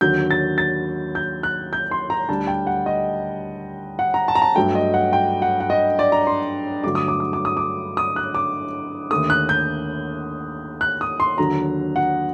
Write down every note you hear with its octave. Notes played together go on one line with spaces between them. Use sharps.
D#2 D3 F#3 G6
A6
A6
G6
F#6
G6
C6
A#5
D2 D3 G3 A5
G5
F#5
D#5
F#5
A#5
A5
A#5
A5
G2 F#3 A3 G5
D#5
F#5
G5
F#5
F#5
D#5
D5
A#5
C6
G2 D3 F#3 A3 D6
D#6
D6
D#6
D6
D#6
D6
D#6
F#6
D6
D#2 D3 A3 D#6
F#6
G6
F#6
D#6
C6
D#2 D3 F#3 A#5
F#5